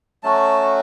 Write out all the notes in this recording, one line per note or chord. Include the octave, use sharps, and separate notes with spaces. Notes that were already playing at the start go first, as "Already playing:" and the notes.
F#3 A3 C#4 F#4 A5